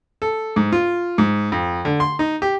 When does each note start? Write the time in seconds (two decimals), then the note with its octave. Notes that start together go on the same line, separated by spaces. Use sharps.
0.22 A4
0.56 G#2
0.72 F4
1.18 G#2
1.52 F2
1.85 D3
2.00 C6
2.19 D#4
2.42 G4